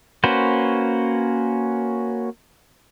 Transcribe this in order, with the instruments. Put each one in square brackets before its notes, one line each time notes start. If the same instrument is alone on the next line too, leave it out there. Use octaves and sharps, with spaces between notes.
[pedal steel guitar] A#3 C#4 F#4 B4 C5